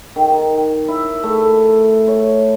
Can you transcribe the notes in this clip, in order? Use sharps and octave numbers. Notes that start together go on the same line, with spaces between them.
D#3
E4
A3
C#5